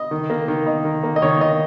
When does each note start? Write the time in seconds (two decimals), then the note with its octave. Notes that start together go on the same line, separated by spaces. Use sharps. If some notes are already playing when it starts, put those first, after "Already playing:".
Already playing: D#5
0.11 D#3
0.30 A#3
0.48 D#3
0.66 D#4
0.85 D#3
1.03 A#3
1.16 D#5
1.22 D#3 C#5
1.41 D#4 D#5